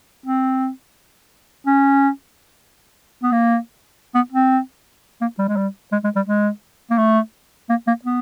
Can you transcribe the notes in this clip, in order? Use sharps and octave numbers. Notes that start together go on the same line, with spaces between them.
C4
C#4
B3
A#3
B3
C4
A#3
G3
G#3
G3
G#3
G#3
G3
G#3
A#3
A3
A#3
A#3
B3